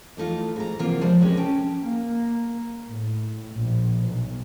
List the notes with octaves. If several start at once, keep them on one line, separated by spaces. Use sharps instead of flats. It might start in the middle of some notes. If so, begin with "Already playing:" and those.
E3 A3 D#4 F4
G#2 A#5
C3 E3 A#3 B3 F4
F3 G3 G#3 A#3 C5
E2 C3 G#3 C#4 A#4
C#4 G5 A5
A#3
A2
A#1
B1